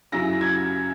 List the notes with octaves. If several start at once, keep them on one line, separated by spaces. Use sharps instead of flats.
F#2 C#3 F#3 C#4 E4 A#6
G#6